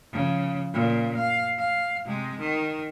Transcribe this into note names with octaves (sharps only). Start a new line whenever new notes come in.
C#3 F3
A#2 C#3
F5
F5
C3 G#3
D#3